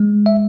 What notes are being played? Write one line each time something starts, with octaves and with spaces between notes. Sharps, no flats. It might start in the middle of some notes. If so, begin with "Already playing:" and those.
Already playing: G#3
E5